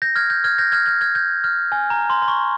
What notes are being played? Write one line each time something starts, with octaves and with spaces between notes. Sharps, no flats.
G6 A#6
F6 G#6
G6
F6 G#6
G6 A#6
F6 G#6
F6 G#6
F6 G#6
G6
F6
G#5
A#5
C6
C6
C#6